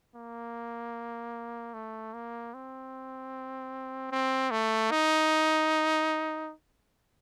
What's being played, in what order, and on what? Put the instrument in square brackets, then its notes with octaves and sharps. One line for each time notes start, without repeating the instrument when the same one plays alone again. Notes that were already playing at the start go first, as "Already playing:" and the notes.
[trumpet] A#3
A3
A#3
C4
C4
A3
D#4